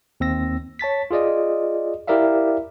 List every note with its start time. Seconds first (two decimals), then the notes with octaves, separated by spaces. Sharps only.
0.20 D#2 C4 E6 A#6
0.79 C#5 A5 A6 B6
1.11 F4 G#4 D5 D#5
2.07 E4 G4 A#4 D5 E5 F5